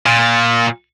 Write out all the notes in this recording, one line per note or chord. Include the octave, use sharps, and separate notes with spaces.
A#2